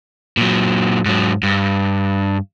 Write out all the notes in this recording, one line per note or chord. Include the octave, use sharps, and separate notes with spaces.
A#2 F#3
G#2 F#3
G2